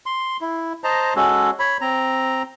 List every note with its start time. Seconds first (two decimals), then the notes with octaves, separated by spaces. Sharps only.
0.06 C6
0.41 E4
0.84 C5 D#5 A5 A#5
1.16 G#3 C#4 F#4 A4
1.59 C#5 B5
1.81 C4 A#5